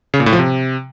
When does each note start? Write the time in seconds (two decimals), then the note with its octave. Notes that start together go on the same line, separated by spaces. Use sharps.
0.14 C#3
0.20 A#2
0.26 A2
0.33 F3
0.39 C3